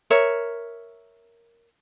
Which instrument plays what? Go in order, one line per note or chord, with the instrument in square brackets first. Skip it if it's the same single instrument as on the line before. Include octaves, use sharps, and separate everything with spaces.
[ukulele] A#4 C#5 E5